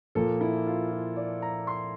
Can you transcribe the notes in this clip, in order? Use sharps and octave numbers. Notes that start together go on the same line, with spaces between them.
A#2 F3 A#3 A4
E4
F4
F4
D5
A#5
C6